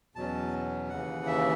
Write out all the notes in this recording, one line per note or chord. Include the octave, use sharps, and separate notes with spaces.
E2 B2 F#3 C#4 A5
D#2 C#3 E3 F#5
E5